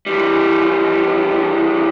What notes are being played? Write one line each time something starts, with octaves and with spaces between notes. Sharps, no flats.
E3 G3